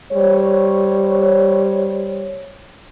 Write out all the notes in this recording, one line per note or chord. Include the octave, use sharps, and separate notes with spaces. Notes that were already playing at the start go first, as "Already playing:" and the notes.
G3 C5 C#5